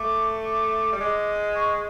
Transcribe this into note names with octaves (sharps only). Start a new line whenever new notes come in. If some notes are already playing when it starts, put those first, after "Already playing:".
Already playing: A3 D6
D6
G3
G#3
C#6